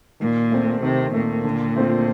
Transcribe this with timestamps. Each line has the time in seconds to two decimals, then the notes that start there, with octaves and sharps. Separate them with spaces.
0.20 A#2 D#3
0.52 A3 C4
0.83 C3 D#3
1.13 A#2 A3 C4
1.44 D3
1.76 A3 C4 F4